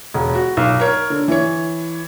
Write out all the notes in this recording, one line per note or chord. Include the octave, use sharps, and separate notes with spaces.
E1
F#4
B1
A#4 C#5
D3
E3 C#5